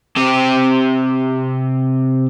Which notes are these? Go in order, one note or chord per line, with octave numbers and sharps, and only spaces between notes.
C3 G4